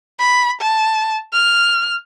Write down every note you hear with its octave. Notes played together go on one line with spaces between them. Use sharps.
B5
A5
F6